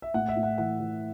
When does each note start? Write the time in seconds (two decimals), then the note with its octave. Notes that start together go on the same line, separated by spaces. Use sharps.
0.02 E5
0.14 A2 F#5
0.29 E5
0.36 A2
0.43 F#5
0.58 E3 F#5
0.80 E3